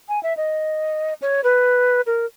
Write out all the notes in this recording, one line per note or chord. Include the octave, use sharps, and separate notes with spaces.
G#5
E5
D#5
C#5
B4
A#4